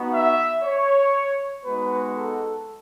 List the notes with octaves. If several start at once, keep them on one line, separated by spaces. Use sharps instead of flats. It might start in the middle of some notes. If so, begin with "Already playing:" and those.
Already playing: B3 D#4 F#4
E5
C#5
G#3 B3 D#4 F#4 B4
A4